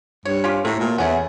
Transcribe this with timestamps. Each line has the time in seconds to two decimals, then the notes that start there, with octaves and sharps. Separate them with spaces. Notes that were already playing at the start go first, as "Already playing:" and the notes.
0.25 G2 C#5
0.44 C#4 F4 G4
0.65 A2 C3 F#3 A4
0.79 A#2
0.98 E2 C#4 G#4 E5 F#5